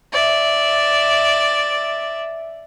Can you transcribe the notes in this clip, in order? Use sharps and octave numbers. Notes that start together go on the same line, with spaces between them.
D5 E5